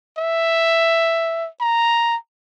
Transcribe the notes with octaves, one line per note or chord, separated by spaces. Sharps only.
E5
A#5